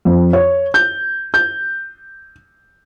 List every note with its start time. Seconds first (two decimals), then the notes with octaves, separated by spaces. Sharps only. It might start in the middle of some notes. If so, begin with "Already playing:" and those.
0.05 F2
0.33 C#5
0.74 G6
1.34 G6